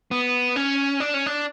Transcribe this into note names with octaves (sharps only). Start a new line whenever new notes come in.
B3
C#4
D4
C#4
D4